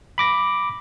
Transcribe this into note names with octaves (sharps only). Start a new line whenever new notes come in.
B5 D6 A#6